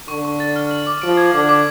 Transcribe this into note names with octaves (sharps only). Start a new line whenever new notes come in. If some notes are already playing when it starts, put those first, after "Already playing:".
D3 C#6
C#6
A6
F6
F#7
D6
F3 D7
G#6
D3 D6
D6